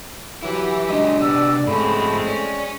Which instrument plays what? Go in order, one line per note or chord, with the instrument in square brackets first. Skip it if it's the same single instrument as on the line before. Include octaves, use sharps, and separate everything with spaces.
[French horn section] E3 F#3 [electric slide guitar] E4 B4 [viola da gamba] G4 [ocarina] E5
[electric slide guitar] F#3 G#3 C#4 [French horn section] D4 [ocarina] D#5
[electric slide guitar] C3 B3 [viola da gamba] D5 [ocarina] E6
[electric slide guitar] G#2 C#4 [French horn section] F3 A3 [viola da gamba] G#3 C4 [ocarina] B5
[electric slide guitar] C#4 [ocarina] D5